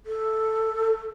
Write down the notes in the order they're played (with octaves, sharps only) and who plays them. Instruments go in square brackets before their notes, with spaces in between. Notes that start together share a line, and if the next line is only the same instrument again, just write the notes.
[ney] A4